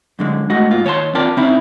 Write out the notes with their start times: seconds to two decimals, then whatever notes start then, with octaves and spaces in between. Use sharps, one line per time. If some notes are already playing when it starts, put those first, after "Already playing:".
0.19 F#2 D3 G#3
0.50 G#3 A3 F#4 D#5 F#5
0.71 G#2 A#3 F4
0.85 D#2 C#5 G#5 A5 C6
1.15 C4 F4 A#4 D5 G5 A5
1.37 C#3 C4 D#4 E4